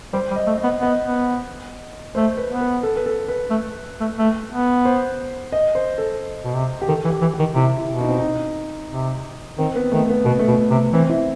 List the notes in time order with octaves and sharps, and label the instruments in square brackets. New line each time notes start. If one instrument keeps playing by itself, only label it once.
[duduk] G3 [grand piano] C5
[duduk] G3
[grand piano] D#5
[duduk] A3
[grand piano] D#5
[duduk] B3
[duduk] B3 [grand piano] D#5
[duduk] B3
[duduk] A3 [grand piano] C5
[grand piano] B4
[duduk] B3
[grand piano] B4
A4
B4
A4
B4
[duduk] A3
A3
A3
B3
[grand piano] C5
D#5
C5
A4
[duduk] B2
C3
[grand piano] G4
[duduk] D#3 [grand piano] A4
[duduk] E3
[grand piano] G4
[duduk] E3
[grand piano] G4
[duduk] D#3
[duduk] C3 [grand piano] E4
[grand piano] E4
[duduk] B2
[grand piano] D#4
C4
D#4
[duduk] C3
[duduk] D#3 [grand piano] C4
[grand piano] B3
[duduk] D#3 [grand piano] A3
[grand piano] B3
[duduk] B2 [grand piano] B3
[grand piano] A3
[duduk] B2
[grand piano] B3
[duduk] C3
[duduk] E3 [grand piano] C4
[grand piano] E4